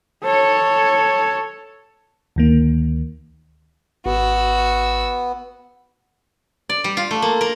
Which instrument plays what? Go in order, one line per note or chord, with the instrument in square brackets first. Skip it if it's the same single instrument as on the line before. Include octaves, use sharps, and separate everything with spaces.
[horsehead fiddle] A4 C#5
[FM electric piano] D2 D#3 A#3
[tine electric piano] G#1 [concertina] B3 [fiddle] F#4 E6
[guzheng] D5
G3
F4
A3
A#3
A#4